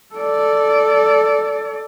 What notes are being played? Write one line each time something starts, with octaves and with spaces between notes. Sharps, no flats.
A4 D5